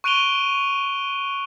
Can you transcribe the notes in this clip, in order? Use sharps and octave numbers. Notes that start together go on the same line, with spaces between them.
C#6 F#6 D7 D#7 F7 G7